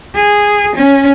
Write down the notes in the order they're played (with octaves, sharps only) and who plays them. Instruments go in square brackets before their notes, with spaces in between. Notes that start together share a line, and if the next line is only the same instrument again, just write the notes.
[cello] G#4
C#4